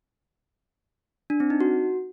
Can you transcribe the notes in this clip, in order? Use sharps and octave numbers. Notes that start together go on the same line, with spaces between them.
D4
C4
D#4
F#4